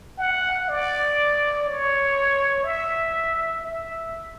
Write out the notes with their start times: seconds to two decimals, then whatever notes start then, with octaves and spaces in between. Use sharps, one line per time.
0.18 F#5
0.69 D5
1.67 C#5
2.64 E5
3.63 E5